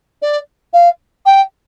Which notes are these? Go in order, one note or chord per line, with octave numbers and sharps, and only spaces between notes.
D5
F5
G5